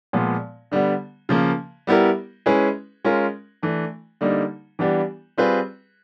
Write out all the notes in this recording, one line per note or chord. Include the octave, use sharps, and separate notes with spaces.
A#2 F3 G#3 B3
D3 G3 B3
C#3 F3 A#3
G3 B3 E4 G4 A#4
G#3 C#4 E4 G#4 B4
G#3 C#4 F4 A#4
E3 A3 D4
D3 G3 A#3 D#4
E3 G3 B3 D4 G4
G3 C4 F4 G#4 B4